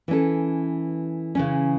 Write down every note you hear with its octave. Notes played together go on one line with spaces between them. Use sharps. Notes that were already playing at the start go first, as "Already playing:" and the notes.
E3 C#4 A4
C#3 E3 C#4